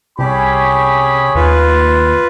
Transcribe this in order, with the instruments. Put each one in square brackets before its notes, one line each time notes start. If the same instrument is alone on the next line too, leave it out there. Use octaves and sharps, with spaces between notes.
[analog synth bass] C2 [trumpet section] C#4 G#4 B5 [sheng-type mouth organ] G4
[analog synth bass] D#2 [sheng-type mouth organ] F4 B4